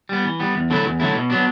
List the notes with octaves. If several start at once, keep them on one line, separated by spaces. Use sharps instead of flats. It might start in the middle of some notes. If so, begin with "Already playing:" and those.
G3 B3
E3
G3 B3
E2
D3 F#3 A3 E4
E2
D3 F#3 A3 E4
B2
F#3 B3 D4